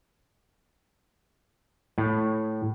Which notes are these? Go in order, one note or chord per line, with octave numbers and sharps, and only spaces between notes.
A2